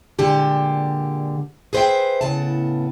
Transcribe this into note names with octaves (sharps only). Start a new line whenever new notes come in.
A#2 D3 G#3 G4 A5
G#4 B4 C5 D#5 E5 G5
A2 C#3 B3 A5